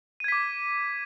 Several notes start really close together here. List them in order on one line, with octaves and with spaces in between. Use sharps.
D#7 G#6 B6 D6